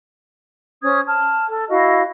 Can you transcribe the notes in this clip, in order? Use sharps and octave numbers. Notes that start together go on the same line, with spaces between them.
C#4 C5 D#6 G#6
A5 F6
A4
E4 F#4 D#5 F5